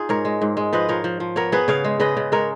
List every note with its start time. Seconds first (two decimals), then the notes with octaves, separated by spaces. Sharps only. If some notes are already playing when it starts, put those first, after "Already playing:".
Already playing: D#4 F4 G#4
0.09 G#2 A#4 C#5
0.25 G#3
0.42 G#2
0.57 G#3
0.73 F3 B4 D#5
0.89 F3 A#4 C#5
1.04 F3
1.20 F3
1.36 B3 A#4 C#5
1.52 B3 G#4 B4
1.68 C#3 C#5 F5
1.84 G#3
2.00 C#3 B4 D#5
2.17 C#3
2.32 G#3 A#4 C#5